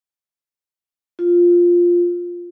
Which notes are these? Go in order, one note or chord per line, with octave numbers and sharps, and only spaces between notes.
F4